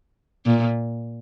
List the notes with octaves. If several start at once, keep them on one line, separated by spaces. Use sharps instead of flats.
A#2